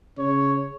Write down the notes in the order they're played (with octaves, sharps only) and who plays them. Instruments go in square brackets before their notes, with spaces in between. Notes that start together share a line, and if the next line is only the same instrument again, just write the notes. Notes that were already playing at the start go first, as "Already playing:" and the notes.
[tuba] C#3 [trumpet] C#5